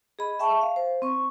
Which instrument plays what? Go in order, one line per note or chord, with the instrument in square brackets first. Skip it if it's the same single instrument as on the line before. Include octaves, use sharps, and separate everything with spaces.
[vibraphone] G#4 D#5 B5
E5 G5 A5 C#6
F5
C5
C4 C#6